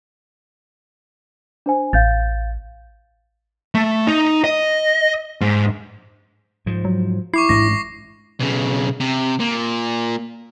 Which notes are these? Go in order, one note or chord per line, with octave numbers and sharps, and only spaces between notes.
D4 C5 G#5
A1 F5 G6 A6
A3
D#4
D#5
G#2
G#2 F3
F#3
E4 C#6 D6 C7
A1 G#2 D4 A#6
B1 C#3
C3
A#2